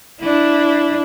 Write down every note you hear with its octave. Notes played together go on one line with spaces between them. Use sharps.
D4 E4